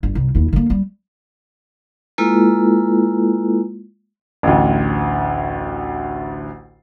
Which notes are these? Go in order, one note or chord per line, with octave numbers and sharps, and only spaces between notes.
G1
C2
D#2 E4
D3 A#3
G3
G#3 A#3 E4 F4 A4 B4
A1 D2